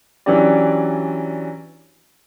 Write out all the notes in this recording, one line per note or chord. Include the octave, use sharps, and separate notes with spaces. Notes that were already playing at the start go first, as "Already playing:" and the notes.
E3 F#3 C#4 D4 G4 D5